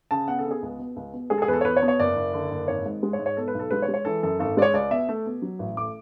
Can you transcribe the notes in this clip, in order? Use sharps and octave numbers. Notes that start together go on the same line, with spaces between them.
C#3 A5
B3 F#5
A4
B3
G#4
C#2
B2
C#2
B2
G#3 G#4
A4
G#4
E2 B4
A4
C#5
E2 B4
C#5
B2
C#5
F#1 D5
F#1
D3
F#1
G#1 C#5
G#2
G#3
C#5
G#2
C#5
B2 A4
B4
B1 A4
G#3 B4
C#5
G#3
C#5
E3 A4
F#2 A4
G#1 A4
G#3 C#5 D5
C#2 D5
B2 E5
A3
B2
F#3
A1
A3 D6